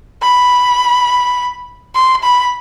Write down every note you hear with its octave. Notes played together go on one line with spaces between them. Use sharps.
B5
C6
B5